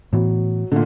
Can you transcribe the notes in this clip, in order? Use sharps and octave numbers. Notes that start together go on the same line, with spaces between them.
A2 E3 F#3 B3
A#2 D3